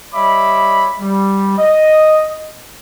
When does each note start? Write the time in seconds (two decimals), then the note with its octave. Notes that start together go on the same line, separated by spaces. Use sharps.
0.13 G3 C#5 D#5 E5 B5 D6
1.00 G3
1.58 D#5